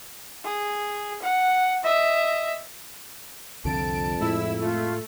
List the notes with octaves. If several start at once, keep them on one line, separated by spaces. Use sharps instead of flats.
G#4
F#5
D#5 E5
C2 F2 D3 F3 A5 D7
A2 G#3 E4 E6
A3 F4